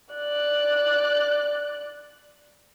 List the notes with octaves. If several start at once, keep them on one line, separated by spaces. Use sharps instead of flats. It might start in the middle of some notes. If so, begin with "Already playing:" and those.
D5 F#6